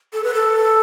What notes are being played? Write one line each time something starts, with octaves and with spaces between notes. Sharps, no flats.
A4
B4
A4